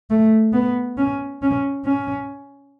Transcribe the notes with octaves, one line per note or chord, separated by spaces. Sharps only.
A3
B3
C#4
C#4
C#4